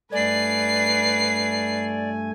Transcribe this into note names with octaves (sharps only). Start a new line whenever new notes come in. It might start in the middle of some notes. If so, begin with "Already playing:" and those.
G2 A3 B4 D5 G#5 C7